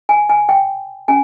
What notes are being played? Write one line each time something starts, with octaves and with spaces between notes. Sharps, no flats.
G#5
G#5
G5
C#4 G#5